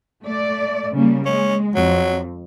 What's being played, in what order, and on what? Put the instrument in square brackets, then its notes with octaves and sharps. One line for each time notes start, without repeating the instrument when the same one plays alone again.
[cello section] A3 D5
C#3 G3 A#3
[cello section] G#3 [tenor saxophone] C#4
[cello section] F2 [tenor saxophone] F#3